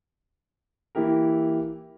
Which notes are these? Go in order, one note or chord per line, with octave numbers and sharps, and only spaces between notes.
E3 A#3 E4 G4 A#4